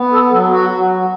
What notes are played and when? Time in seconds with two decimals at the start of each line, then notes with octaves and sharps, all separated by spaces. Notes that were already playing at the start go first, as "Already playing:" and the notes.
Already playing: B3
0.13 A4
0.31 F#3 A4
0.50 F#4
0.70 F#3